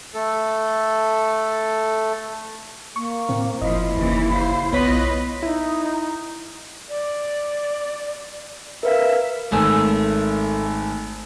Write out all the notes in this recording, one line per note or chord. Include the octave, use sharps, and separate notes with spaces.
A3 A4
A#3 C#6
A2 C4
F#1 A#2 F3 E4 D#5
F#1 D#2 C#3 E3
C5 F5
B1 B3 F4 B4 C#5 D#5 B6
D#4 E4
D5
A#4 B4 E5 F5
G#1 A3 G#5 E6